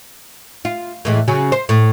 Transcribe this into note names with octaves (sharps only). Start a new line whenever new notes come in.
F4
A2 E3 G#3
C#3 F#3 C#4
C5
A2